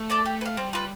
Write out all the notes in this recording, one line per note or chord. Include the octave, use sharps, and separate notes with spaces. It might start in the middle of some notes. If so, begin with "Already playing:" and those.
Already playing: A3
A4 D5 A5
G4
B4
F5
G3 C4
F4 B4